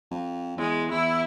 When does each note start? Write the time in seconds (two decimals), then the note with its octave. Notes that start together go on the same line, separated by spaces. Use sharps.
0.11 F2
0.57 E2 G#3
0.91 E2 E4